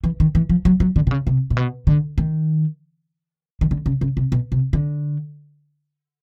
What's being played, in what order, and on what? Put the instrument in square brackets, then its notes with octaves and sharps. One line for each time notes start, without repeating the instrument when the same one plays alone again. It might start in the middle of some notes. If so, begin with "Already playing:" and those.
[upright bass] E3
D#3
E3
F3
F#3
F#3
D3
C3
C#3
C3
A#2
B2
D3
D#3
D#3
D3
C#3
C#3
C3
B2
C3
D3